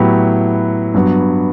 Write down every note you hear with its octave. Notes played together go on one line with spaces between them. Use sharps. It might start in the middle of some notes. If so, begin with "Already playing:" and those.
Already playing: A2 F#3 B3 E4 G4
G2 F#3 B3